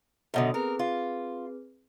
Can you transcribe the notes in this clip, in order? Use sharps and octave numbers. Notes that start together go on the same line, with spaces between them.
F#2 B2 D3 A4 D#6
C4 G#4 A#4 B4
F4